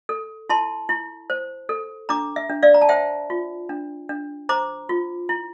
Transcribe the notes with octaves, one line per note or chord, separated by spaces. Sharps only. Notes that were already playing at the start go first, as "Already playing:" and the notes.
A4
E4 A5 C6
E4
C5
A4
D4 A#5 D6
E5
D4
D5 F5
A#5
A5
C5 E5 G5
F4
D4
D4
C5 A#5 D6
F4
E4